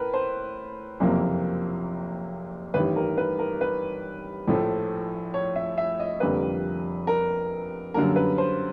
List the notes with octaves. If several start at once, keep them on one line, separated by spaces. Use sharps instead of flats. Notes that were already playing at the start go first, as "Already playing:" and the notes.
Already playing: A2 A#4 B4
C5
F#1 F2 C3 F3 A#3
A1 G2 D#3 G3 B4
A#4
B4
A#4
B4
A#1 A2 F3 A3
C#5
E5
E5
D#5
F1 F2 D3 G3 A#3 B4
A#4
F#2 D3 G3 A#3 A#4
B4
C5